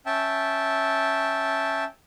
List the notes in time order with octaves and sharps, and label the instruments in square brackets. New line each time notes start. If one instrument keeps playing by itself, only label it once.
[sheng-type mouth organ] C#4 E5 G5 A5